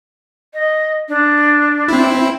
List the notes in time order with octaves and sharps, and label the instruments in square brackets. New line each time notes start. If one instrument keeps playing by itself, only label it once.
[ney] D#5
D4
[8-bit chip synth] C4 E4